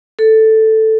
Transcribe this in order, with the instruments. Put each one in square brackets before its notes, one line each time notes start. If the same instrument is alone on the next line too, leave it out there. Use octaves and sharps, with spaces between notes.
[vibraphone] A4